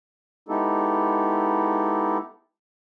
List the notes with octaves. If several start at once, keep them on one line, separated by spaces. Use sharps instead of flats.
G#3 B3 D#4 E4 G4 A4